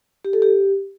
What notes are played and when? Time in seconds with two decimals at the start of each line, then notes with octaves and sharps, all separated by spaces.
0.25 G4
0.33 A4
0.42 G4